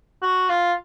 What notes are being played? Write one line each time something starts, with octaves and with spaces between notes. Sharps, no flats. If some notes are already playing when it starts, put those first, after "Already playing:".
F#4
F4